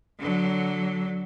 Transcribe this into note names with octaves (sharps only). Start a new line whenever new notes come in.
D3 F#3